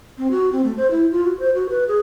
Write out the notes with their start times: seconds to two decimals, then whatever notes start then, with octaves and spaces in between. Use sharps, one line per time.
0.18 C4
0.31 F#4
0.52 C4
0.64 A3
0.77 C5
0.91 E4
1.11 F4
1.25 F#4
1.39 C5
1.54 F#4
1.69 B4
1.88 G#4